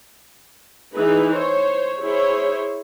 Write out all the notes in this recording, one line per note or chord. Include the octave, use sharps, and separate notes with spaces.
E3 D#4 G#4 B4
C5 C#5
E4 G#4 C5 C#5